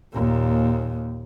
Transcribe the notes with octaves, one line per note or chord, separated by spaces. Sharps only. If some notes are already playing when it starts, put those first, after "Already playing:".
D#2 A#2